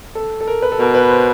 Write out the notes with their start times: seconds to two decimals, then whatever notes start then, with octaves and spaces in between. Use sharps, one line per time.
0.15 A4
0.41 A4
0.47 A#4
0.62 B4
0.72 A4
0.79 B2 A#4
0.94 B4
1.10 C5